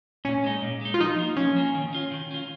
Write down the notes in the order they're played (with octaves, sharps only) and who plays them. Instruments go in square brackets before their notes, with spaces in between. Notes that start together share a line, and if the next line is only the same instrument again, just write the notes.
[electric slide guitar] A#2 [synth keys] C#4
[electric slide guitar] G#3 D#4
A#2
G#3 D#4
[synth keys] F4
[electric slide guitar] F3 [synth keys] D#4
[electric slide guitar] A#3 F4
[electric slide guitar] F3 [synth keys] C#4
[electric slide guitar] A#3 F4
D#3
C#4 F4
D#3
C#4 F4